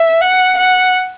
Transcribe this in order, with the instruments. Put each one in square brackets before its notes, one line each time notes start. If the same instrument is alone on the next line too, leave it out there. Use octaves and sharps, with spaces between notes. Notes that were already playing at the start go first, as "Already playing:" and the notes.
Already playing: [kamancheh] E5
F#5
F#5